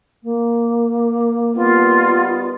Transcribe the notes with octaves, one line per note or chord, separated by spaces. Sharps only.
A#3
D#3 G3 B3 F4